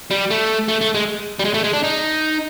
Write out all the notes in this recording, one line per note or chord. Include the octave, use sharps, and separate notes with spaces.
G3
A3
A3
A3
G#3
G3
G#3
A3
G#3
D4
D#4